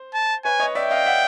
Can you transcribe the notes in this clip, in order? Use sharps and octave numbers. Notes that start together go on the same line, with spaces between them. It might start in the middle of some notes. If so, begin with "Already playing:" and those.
Already playing: C5
A5
B4 C#5 G#5
C#5 D#5
D5 E5 G5
D#5 F5
E5 F#5